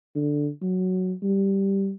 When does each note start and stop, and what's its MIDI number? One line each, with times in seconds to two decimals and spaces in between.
0.15 0.49 50
0.62 1.13 54
1.22 1.92 55